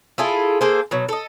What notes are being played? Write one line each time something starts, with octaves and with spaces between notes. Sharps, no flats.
E4 F4 G#4 A4
A#3 G#4 A4 C5
B2 F#3
A4 D#5